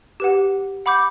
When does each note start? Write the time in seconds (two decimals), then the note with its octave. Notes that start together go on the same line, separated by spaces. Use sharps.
0.20 G4 B4 F#5
0.86 F#5 B5 D6 G6